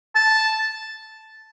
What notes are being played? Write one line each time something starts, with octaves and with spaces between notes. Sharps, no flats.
A5